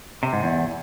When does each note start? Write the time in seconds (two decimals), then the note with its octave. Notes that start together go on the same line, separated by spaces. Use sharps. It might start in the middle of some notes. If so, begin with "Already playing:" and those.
0.23 C3
0.33 G#2
0.43 E2